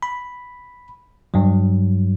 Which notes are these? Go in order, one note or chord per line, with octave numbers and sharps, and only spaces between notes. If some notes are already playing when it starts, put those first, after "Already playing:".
B5
G2 F#3